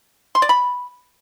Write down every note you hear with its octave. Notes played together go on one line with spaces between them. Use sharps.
C6
D5
B5